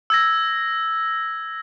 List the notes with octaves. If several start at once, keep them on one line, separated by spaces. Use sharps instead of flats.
E6 G#6 A#6